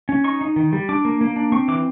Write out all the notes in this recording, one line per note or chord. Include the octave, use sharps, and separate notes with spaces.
C#4
D#4 C#6
D#4
D#3
G3
D4 D6
A#3
A#3
D4
C4 C#6
E3 D6